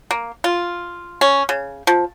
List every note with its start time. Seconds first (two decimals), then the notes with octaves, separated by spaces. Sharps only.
0.11 A#3
0.44 F4
1.21 C#4
1.49 C#3
1.87 F3